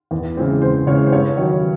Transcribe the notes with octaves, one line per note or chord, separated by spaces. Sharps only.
E2
C#3 E3 G#3 C4
E2 C5
C#3 E3 G#3 C4 C#5
C5
G2 C#5
D#3 F#3 C#5